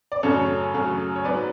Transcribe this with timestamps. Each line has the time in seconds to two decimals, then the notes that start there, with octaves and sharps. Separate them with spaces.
0.12 D5
0.23 F#2 C#3 F#3 A3 A4 C#5
0.74 F#2 C#3 F#3 A3
1.15 C#5
1.24 G#2 F#3 B3 B4 D5